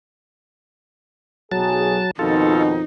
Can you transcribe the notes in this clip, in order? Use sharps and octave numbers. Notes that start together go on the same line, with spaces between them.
B1 F#3 G#4 A5
F2 B2 D#3 D#4 F4 A4